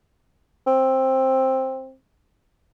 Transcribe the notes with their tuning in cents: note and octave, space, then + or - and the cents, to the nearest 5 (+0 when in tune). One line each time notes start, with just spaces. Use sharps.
C4 +10